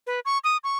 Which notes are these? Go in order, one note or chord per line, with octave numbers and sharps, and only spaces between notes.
B4
C#6
D#6
C#6